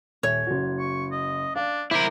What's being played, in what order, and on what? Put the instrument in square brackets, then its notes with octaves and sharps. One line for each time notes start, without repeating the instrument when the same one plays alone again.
[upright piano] D#1 E5 [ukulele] C#5
[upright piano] F#1 F#4
[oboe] C#6
D#5
[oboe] D4 [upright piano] D5 F5
[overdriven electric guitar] E4 A#4 [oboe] C5 [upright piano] D6